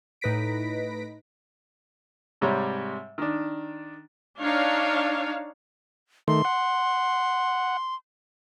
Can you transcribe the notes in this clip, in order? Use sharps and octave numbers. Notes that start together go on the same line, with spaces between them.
A2 D#4 B4 A#6 B6 D7
G#2 C3 G3 C#5 A#5
D#3 D4
D4 D#4 C#5 F5
D#3 A3 C6
F#5